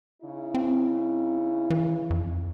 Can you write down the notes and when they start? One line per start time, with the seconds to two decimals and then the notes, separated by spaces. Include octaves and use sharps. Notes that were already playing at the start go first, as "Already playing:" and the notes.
0.22 C#3 D#4 E4
0.54 C4
1.70 E3
2.10 F2